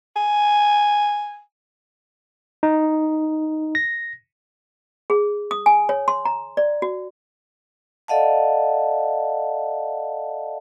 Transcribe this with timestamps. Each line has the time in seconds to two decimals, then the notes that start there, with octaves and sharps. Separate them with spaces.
0.16 G#5
2.63 D#4
3.75 A#6
5.10 G#4
5.51 D#6
5.66 G#5
5.89 C#5
6.08 C6
6.25 A#5
6.57 D5
6.82 F#4
8.08 A4 D5 D#5 F5 F#5 A5